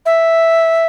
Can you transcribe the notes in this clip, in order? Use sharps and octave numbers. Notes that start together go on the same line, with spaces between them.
E5